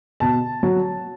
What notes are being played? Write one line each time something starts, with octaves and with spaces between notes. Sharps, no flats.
B2 A5
F#3